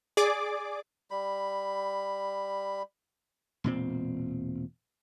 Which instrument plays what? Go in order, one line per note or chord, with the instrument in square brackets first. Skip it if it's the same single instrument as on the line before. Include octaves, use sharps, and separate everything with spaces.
[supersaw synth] G#4 D5 D6
[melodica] G3 B5
[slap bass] E1 A#2 C4